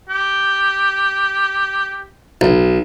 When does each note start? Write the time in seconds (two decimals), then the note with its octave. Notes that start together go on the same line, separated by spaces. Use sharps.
0.09 G4
2.41 B1